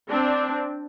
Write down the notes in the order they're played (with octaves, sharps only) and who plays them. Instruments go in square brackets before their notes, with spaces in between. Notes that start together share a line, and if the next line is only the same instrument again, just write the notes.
[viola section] C4 D4